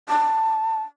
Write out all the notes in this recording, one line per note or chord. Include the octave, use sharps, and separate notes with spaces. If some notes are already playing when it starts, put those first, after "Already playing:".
A5